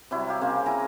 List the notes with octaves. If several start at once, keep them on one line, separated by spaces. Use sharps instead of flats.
C3 F#3 G3 E4
G4 F5
C#3 A#3 C4
E4 A#4 G#5 A#5